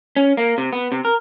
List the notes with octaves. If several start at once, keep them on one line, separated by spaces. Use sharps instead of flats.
C#4
A#3
C3
B3
C3
A#4